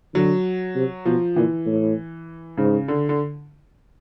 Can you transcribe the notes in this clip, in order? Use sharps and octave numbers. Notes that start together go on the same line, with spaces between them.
D3 F#3
C3
B2 F3
A#2 E3
A2
G#2 C#3
D3
D3